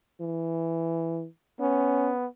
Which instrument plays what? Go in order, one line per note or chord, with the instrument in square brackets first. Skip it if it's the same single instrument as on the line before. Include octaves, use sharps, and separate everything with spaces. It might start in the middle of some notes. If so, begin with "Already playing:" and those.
[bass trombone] E3
[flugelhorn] B3 [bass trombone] C#4